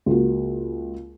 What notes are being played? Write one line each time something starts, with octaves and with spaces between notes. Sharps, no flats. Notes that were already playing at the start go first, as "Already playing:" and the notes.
C#2 A#3 F#4